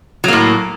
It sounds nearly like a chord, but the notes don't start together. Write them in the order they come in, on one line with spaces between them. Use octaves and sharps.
F#3 A#3 A2